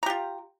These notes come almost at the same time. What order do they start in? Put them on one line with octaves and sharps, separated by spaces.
A#5 G4 F4